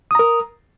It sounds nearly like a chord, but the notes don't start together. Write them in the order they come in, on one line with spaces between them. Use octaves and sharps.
D#6 A#5 A#4